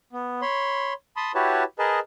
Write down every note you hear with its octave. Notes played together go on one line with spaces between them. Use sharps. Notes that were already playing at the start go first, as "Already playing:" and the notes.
B3
C#5 B5 C6
A5 B5 C6 D#6
E4 F#4 G4 B4 C#5 A5
G#4 A#4 B4 D#5 A5